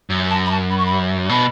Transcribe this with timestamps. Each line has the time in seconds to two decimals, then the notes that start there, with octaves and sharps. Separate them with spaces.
0.10 F#2
0.30 A5
0.46 B5
0.51 A5
0.70 B5
0.78 C#6
0.85 B5
1.29 B2 B5